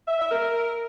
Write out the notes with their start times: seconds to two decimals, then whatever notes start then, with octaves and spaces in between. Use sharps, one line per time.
0.08 E5
0.20 E5
0.31 A#4